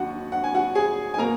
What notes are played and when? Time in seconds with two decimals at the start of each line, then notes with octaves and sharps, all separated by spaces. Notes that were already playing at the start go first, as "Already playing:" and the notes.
Already playing: D#2 D#3 F#3 F#4 F#5
0.32 F#5
0.44 G#5
0.54 F#4 F#5
0.75 G#4 G#5
1.14 G#5
1.18 B2 A#3 A#4 A#5